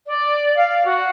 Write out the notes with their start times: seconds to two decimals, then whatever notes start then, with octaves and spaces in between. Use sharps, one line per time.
0.07 D5
0.56 F5
0.85 F#4